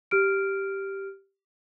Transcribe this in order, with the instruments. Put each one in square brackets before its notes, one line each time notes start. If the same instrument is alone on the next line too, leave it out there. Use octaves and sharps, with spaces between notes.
[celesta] G4 F6 D7